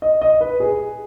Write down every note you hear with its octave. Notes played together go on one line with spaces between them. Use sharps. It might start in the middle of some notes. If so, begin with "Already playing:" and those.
D#5
D#5
B4
G#4